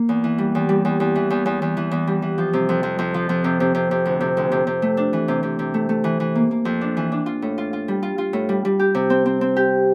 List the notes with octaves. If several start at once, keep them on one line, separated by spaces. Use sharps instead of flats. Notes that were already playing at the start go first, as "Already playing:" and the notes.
Already playing: A#3
E2
E3
G3
E2
G3
E2
E2
E3
E2
E2
E2
E3
E2
G3
E3
F3
C3
F2
F2
F2
F3
F2
C3
C3
C3
C3
D2
C3
D2
C3
C3
A3
D4
E3
C3
C3
C3
A3
A3
E3
E3
A#3
A#3
F2
D4
E3
D4
F4
A2
F4
F4
G3
F4
F4
A2
G3
G3
G4
C3
C4
C4
C4
G4